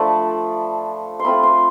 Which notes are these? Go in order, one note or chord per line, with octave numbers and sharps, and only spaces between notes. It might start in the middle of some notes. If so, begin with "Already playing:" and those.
Already playing: F3 A3 D4 A5 B5
C6
A3 C4 F4 B5
C6